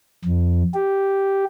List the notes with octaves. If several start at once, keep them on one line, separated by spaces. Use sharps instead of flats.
F2
G4